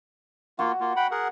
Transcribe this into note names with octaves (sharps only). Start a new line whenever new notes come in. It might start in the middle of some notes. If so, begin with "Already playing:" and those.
A#3 F4 F#4
A#3 F4
F#5 G5 B5
G#4 A#4 F#5